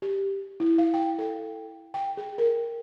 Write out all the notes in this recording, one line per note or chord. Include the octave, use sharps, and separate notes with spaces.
G4
E4
F5
G5
A4
G5
G#4
A#4